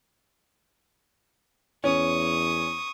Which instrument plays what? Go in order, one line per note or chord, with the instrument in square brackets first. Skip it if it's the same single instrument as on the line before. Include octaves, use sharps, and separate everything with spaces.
[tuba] E2 [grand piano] C#4 [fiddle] C#6 D#6